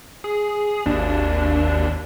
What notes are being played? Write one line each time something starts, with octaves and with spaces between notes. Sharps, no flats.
G#4
G#1 D#2 D4